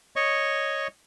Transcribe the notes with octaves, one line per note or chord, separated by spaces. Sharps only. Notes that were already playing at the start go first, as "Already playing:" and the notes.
C#5 D#5 C#6